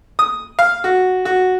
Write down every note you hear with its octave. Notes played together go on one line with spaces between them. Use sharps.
D#6
F5
F#4
F#4